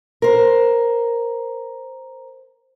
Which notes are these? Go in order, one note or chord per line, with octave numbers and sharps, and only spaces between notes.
A#4 C5